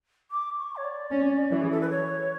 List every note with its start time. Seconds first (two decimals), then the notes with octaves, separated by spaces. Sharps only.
0.31 D6
0.58 C#6
0.76 C#5
0.84 D5
1.10 C#4
1.51 E3 F#4
1.62 G#4
1.71 A4
1.81 B4
1.90 C#5